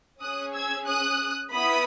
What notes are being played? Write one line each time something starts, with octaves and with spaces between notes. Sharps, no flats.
C#4 G#4 D#6 F#6
E6 G#6
D#6 F#6
B3 E4 B5 D#6